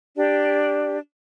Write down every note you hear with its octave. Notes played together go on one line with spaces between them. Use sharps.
D4 G4 D5